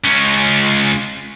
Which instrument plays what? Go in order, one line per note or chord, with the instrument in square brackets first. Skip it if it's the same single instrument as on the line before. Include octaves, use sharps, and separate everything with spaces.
[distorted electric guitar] C#2 C#4